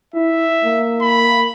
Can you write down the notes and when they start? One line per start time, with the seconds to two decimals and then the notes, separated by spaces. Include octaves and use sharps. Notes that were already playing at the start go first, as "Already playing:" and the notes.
0.14 E4 E5
0.64 A#3
1.01 B5